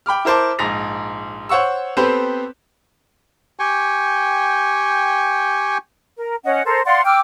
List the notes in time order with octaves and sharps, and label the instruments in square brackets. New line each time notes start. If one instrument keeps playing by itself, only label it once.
[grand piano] G5 B5 D6 F6
E4 A#4 C5 A5 D6
A#1 G#2 A#6 F7
C5 C#5 F#5 C#6 E6
B3 C4 G4 A4 B4 C5
[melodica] G4 G5 G#5 C#6
[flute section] A#4
C#4 D#5 F#5
A4 A#4 C5
D5 F5 F#5 C6
G5 D6 E6 F6